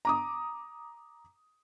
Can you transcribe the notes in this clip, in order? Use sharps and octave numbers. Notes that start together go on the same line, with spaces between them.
A#5 D6 D#6